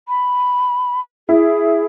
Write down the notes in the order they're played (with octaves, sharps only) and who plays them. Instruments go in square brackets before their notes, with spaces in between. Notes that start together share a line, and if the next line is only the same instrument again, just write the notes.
[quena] B5
[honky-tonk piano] E4 [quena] G#4